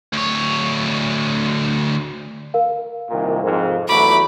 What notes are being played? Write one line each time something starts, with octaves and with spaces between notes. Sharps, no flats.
D2 C#5
A#4 F5
C2 A#2 D#3
F2 G#2
E2 F#3 A3 B5 D6